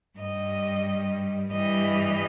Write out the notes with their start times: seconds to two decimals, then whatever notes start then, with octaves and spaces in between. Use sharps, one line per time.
0.19 G2 G3 D#5
1.52 G2 E3 G3 D#5